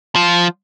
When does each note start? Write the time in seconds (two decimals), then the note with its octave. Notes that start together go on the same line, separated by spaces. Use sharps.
0.16 F3